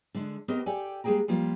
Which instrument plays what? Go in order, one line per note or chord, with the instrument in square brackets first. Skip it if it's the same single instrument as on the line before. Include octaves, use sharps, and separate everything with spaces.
[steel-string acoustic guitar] D3 G#3 D4
B3 C4 G4 A#4 D#5
G4 A4 D5 G5 G#5
G3 G#3 A#3 G#4 G5 A#5
F3 G3 A#3 F4